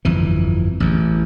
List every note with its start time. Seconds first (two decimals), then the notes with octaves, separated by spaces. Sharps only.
0.05 G1 F2 E3
0.80 A1 E2